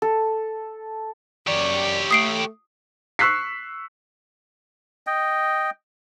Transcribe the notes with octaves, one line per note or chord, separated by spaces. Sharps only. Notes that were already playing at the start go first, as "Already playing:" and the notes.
A4
F#2 G4 C#5 D5
A3 D#6 C7 D7
C#6 E6 F#6 B6 C7
D#5 G5